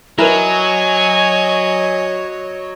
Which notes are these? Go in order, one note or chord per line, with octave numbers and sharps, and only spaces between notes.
F#3 E4 A#4 B4 C#5 D#5 G#5